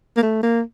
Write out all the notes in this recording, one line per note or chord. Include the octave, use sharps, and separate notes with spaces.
A#3
A3
A#3